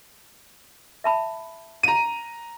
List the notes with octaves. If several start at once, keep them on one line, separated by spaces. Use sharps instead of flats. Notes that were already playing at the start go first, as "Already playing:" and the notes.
E5 A5 B5
A#5 D#7